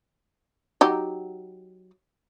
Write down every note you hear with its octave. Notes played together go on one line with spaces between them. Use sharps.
F#3 D#4 G4